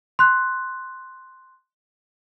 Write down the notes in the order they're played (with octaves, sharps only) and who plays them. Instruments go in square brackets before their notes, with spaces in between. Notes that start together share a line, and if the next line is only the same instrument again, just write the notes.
[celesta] C6 F#6